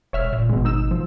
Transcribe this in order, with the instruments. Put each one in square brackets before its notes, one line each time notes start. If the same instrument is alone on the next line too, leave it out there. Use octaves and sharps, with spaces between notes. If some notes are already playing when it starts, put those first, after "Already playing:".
[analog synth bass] E1 [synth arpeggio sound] C#5 E5 F6
[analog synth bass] A#2
[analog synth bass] G#1 [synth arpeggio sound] B2 G#3
[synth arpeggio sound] D#4 E6 E7
F3